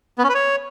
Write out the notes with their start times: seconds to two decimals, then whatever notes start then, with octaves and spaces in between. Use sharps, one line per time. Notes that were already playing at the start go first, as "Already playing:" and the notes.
0.18 B3
0.24 C#4
0.29 B4
0.35 C#5